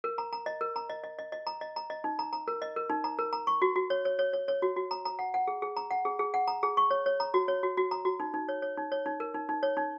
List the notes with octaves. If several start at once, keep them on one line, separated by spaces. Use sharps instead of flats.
A#4
A#5
A#5
D#5
A#4
A#5
D#5
D#5
D#5
D#5
A#5
D#5
A#5
D#5
D#4
A#5
A#5
A#4
D#5
A#4
D#4
A#5
A#4
A#5
C#6
F#4
F#4
C#5
C#5
C#5
C#5
C#5
F#4
F#4
A#5
A#5
F#5
F#5
G#4
G#4
A#5
F#5
G#4
G#4
F#5
A#5
G#4
C#6
C#5
C#5
A#5
F#4
C#5
F#4
F#4
A#5
F#4
D#4
D#4
C#5
C#5
D#4
C#5
D#4
A#4
D#4
D#4
C#5
D#4